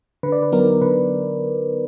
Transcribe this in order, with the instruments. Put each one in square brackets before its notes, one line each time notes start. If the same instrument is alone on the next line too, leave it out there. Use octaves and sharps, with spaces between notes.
[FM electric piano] D3 B4
D5
B4
F#3 B3 D#4 A#4
D3 B4